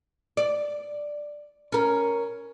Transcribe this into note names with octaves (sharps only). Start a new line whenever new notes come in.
D5
C#4 A#4